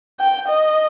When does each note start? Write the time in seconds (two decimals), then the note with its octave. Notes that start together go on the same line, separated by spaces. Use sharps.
0.20 G5
0.48 D#5